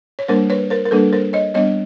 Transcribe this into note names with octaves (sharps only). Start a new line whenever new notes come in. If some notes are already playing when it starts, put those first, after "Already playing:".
C#5
G3 A#3 D4 A#4 C5
B4 C#5
A#4 C5
A#4
G3 A#3 D4 A4 B4
A#4 C5
C#5 D#5
G3 B3 D4 C#5 D#5